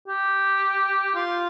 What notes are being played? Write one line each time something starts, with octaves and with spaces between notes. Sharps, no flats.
G4
F4